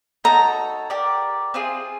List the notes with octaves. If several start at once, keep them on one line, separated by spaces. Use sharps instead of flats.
D#4 F#4 A4 C#5 A#5
G4 A#4 D5
C4 F4 G#4